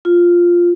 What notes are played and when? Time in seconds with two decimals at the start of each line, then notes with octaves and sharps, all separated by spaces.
0.05 F4